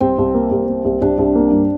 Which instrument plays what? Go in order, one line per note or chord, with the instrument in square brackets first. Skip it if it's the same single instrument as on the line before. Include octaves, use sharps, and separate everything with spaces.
[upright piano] C2 [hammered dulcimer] C4
[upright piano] C2
A#3
C2
A#3
C2
[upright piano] C2 [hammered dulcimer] D4
[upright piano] C2
A#3
G2